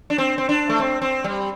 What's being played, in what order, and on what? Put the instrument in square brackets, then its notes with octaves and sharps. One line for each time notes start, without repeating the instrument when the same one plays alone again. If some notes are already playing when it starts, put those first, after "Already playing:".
[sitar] D4
C4
C4
D4
A3
C4
C4
G3